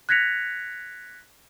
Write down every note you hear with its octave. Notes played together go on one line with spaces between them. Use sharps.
F#6 G#6 A#6 B6 C#7 F7